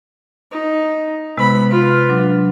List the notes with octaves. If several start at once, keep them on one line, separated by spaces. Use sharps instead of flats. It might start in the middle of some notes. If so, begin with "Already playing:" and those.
D#4
C3 G#3 B3 B5
F4 B4
F#3 D4